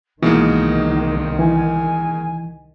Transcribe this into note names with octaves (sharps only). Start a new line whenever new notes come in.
C2 B2 D#3 E3 G#3 A#3 D#4
E3 G#5